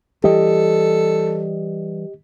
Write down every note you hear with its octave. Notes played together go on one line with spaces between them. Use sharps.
E3 G3 G4 A4 D#5